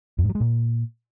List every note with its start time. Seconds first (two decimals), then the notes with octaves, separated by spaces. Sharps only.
0.18 F2
0.24 G#2
0.29 F#3
0.35 G#3
0.40 A#2